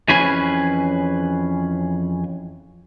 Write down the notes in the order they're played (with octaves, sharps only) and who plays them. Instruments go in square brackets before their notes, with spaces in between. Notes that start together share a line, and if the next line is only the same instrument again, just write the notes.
[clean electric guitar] F2 E3 C#4 G#4 B4 G#5